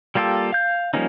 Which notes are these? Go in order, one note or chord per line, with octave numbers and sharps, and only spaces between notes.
G3 A#3 F4 G4 A4
F5 G6
F3 G3 A#3 C#4 D#4